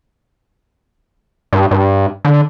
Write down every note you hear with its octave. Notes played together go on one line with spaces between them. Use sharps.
G2
G2
D3